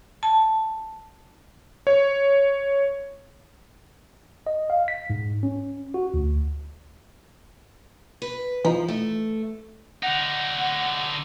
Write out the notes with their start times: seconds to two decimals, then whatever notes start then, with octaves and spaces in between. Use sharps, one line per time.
0.23 A5
1.87 C#5
4.47 D#5
4.70 F5
4.88 B6
5.10 G#2
5.43 C#4
5.94 F#4
6.14 D2
8.22 B4
8.65 E3 F3 D#4
8.88 A3
10.03 D3 D#4 F#5